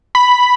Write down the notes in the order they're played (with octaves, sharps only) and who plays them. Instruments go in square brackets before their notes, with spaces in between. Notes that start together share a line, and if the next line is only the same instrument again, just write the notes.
[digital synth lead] B5